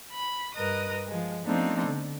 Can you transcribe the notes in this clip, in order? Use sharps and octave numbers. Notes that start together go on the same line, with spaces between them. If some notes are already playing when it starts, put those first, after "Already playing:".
B5
G2 A#4 B4 D#5 D#6
F3 G#3
F3 A3 B3 C4 D4 D#4
D3